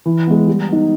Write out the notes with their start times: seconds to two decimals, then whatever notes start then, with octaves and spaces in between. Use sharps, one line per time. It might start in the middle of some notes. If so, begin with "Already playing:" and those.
0.06 E3
0.27 G#3 B3
0.47 G3
0.69 B3 D#4